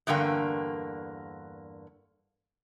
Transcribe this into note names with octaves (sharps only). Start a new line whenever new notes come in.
E2 G2 D3 A#3 G5